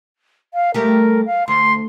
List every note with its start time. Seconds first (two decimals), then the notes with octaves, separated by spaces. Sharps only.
0.54 F5
0.74 G3 A3 G4 A#4
1.26 F5
1.48 D2 C6